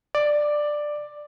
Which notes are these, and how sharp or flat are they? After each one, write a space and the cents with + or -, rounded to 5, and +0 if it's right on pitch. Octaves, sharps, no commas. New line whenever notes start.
D5 +10